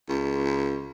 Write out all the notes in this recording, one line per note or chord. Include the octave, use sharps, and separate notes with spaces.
C#2